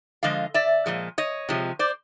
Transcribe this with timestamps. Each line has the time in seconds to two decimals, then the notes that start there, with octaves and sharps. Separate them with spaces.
0.23 D3 F3 G#3 D#5 F5
0.54 D5 E5
0.86 A#2 F3 G#3
1.18 C#5 D#5
1.49 C3 F3 G#3
1.79 C5 D5